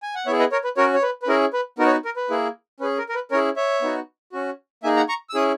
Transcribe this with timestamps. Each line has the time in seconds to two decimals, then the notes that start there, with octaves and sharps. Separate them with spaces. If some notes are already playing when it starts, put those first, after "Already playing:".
0.03 G#5
0.15 F#5
0.26 B3 E4 G#4 C#5 E5
0.39 B4 D#5
0.52 A#4 C#5
0.64 B4
0.77 C#4 F#4 A#4 C#5
0.94 C#5
1.03 B4
1.23 B4
1.28 C#4 E4 G#4 A#4
1.53 B4
1.79 B3 D#4 F#4 A#4
1.86 C#5
1.91 B4
2.05 A#4
2.16 B4
2.30 A#3 E4 G#4
2.80 C#4 B4
2.84 G#4
2.98 A#4
3.09 A#4
3.14 B4
3.31 C#4 E4 G#4 A#4 C#5
3.56 C#5 E5
3.82 B3 D#4 F#4
4.32 C#4 F#4
4.83 A#3 D#4 G#4 E5 G#5
4.96 F#5 A#5
5.09 A#5 C#6
5.29 E6
5.34 C#4 E4 G#4 D#6